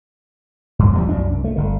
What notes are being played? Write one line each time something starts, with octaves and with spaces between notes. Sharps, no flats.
G2
A1 E2 F3 G3
C2 F#2 D4
C2
A3
G1 D3